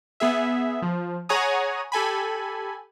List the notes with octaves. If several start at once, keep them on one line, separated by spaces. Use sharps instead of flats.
B3 G#4 E5
F3
G#4 C#5 F#5 G#5 A#5 D#6
G4 A4 G#5 B5